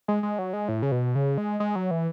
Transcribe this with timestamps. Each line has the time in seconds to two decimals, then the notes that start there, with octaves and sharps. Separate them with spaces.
0.08 G#3
0.23 G#3
0.39 F#3
0.53 G#3
0.69 A2
0.82 C#3
0.92 B2
1.15 C#3
1.38 G#3
1.60 G#3
1.76 F#3
1.91 E3